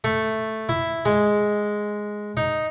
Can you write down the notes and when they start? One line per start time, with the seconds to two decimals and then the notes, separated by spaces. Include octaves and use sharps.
0.04 A3
0.69 E4
1.05 G#3
2.37 D#4